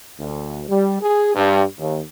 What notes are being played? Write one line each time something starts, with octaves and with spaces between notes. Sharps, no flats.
D2
G3
G#4
G2
D#2